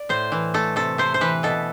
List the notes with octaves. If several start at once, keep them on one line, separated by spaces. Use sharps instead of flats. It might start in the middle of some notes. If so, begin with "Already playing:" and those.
Already playing: D5
A2 C5
E3
A3 A4
C3 A4
C3 C5
C5
E3 B4
B2 A4